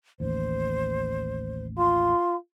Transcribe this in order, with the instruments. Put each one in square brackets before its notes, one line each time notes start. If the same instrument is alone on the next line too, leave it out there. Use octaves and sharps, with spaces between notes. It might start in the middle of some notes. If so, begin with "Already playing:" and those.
[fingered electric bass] A1 D#2 [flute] C5
[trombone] F4 [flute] C6